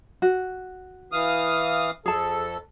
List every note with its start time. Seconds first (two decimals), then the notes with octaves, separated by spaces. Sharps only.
0.22 F#4
1.12 E3 F5 D#6
2.06 F2 G#4 A4 A5